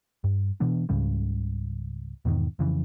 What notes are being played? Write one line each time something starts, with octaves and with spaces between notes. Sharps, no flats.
G2
B2 E3 B3 D4
C#2 G#2 C#3 G3
E2 G#2 B2 D#3
F2 C#3 E3